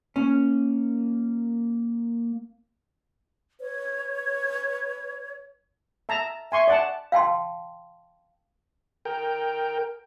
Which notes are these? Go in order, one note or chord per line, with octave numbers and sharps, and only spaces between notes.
A#3 C#4
B4 C#5
E5 A5 A#5
E5 G#5 C6 C#6
D5 F#5 A5
F5 G5 A5 C6
A#4 G5